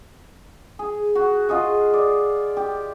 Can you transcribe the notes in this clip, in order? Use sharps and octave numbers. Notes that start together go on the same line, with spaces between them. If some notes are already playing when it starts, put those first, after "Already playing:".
G#4
F#4
F4 G#4 D#5 F#5
D5
G4